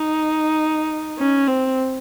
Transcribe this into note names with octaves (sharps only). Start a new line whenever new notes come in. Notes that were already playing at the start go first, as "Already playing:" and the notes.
Already playing: D#4
C#4
C4